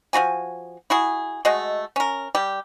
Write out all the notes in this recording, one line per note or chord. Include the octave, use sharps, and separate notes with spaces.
F3 D4 F#4 G#5
E4 F#4 G#4
G#3 A3 F#4 D#5
C#4 A#4
G3 G4